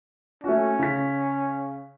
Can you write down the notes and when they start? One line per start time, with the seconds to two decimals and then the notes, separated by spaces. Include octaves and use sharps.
0.44 A3 C#4 F#4
0.79 C#3 B6